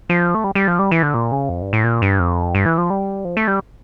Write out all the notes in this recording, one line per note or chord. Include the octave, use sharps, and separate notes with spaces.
F3
A3
G3
G3
F3
G3
E3
D3
A#2
C#3
F2
G2
A2
A#2
G2
F2
G2
E3
F3
G3
F3
A3
G3